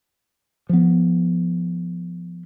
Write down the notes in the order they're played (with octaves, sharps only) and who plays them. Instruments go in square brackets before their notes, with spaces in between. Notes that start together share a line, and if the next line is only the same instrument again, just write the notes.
[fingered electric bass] F3 B3